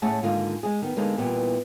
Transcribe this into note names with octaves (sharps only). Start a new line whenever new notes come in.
A2 A3 C#4 G#4 F#5 A5
G#2 D3 D#3 A#3 F4
G#3 G#4
D#3 B3
D3 G#3 A#3 D#4 A4
A#2 E3 G3 B3